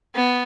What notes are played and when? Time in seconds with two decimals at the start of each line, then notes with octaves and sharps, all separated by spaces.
0.15 B3